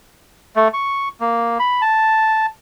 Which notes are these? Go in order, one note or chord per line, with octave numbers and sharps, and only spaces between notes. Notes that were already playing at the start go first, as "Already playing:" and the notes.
A3
C#6
A#3
B5
A5